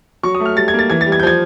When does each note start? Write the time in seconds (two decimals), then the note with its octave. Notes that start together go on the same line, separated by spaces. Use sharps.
0.23 F#3 C#6
0.35 D#6
0.40 A3
0.45 F6
0.56 G3 A6
0.68 G#6
0.73 A#3
0.79 A6
0.90 E3 G#6
1.01 A6
1.06 G3
1.12 G#6
1.20 G6
1.23 F3 G#6